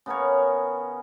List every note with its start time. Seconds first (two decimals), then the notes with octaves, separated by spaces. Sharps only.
0.06 C#3 B3 A#4 C#5